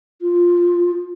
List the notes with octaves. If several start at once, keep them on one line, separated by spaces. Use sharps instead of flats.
F4